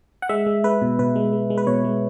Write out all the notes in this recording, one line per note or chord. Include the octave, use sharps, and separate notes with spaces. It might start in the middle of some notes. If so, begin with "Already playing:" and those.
F#5
G#3 E5
G#3
G#3 B4
B2
B2 B4
G#3
G#3
G#3
B4
B2 C#5
G#3